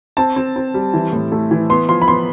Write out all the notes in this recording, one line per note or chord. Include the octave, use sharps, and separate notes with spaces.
C4 A5
C4
C4
G3
E3
A2
A3
E3
B3 C6
F3 C6
B5
B3 C6